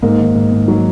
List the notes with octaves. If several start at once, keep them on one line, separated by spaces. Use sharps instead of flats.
G#2 A#3
D#3
G#2
G#2
F#3